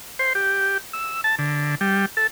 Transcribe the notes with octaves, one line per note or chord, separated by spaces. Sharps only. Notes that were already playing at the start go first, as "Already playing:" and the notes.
C5
G4
E6
A5
D3
G3
A4